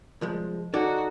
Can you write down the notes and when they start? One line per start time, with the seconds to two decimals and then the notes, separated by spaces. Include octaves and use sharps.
0.21 C2 F3 G#3
0.74 D#4 F#4 A4 D5